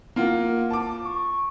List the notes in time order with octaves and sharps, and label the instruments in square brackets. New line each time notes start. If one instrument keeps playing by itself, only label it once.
[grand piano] A#3 F4 F#5
A5 D6
[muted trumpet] C#6